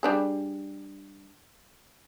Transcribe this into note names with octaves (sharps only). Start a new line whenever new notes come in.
G3 D4 G#4